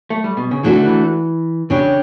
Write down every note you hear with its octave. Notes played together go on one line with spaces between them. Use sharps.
A3
G3
B2
C#3
E3 A3 D4 F#4 A4
D3
E3
C#3 G3 D4 G4 C#5